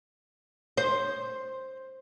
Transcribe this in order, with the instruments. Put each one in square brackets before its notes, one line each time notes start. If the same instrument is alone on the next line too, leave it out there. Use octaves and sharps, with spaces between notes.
[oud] C5